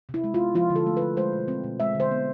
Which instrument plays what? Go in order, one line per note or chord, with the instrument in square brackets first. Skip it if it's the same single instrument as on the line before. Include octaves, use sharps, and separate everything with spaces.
[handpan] C3
E4
G#3
F4
B3
F3 F4
D3
A4
A3
D3 B4
G#3 C5
B2
C4
B2
G#3 E5
D3 C5
B3